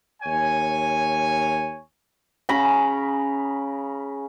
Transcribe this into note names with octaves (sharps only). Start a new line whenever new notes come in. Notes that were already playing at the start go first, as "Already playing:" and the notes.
D#2 C#5 G#5
C#3 A#5 B5